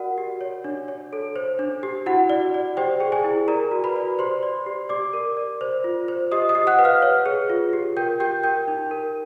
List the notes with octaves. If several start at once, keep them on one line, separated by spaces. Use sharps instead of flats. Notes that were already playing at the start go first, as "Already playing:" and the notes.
Already playing: F#4 A#4 D5 F#5
G4
C#5
D4
C#5
A4
C5
D4
G4
E4 F#4 F#5
D5
D5
G4 C5 G5
G#4
G#4 G#5
E4
A#4 D5 A#5
F#4
B4 B5
D5
G4 C5 C6
D5
G4
G4 D5 D6
A#4
D5
C5
F4
C5
G4 D#5 D#6
D#5 D#6
G4
F#5 F#6
B4
F5 F6
C#5
G#4
F4
G4
A#4 G5 G6
G4 G5 G6
A#4 G5 G6
D#4
A#4